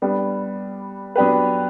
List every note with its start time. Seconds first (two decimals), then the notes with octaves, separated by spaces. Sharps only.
0.02 G3 B3 D4
1.16 F#3 B3 D4 G4 B4